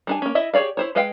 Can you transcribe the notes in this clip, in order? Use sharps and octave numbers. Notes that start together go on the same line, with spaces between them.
G3 D4 G#5
A#3 C#4
E4 D#5 E5
G4 G#4 C#5 D5 F5
E4 C5 C#5
G#3 B4 D#5 F5 G5